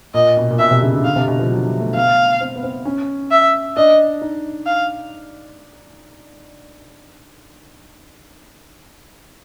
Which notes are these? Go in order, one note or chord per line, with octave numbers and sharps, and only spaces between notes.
A#2 D#5
B2
A#2
B2 E5
C3
C#3
D3
D3 F5
C3
B2
F3
F#3
G3
A3
B3 F5
C4
B3
C4
C#4
E5
D4 D#5
D#4
F5